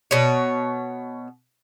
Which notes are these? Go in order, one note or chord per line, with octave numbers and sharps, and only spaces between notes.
B2 C#5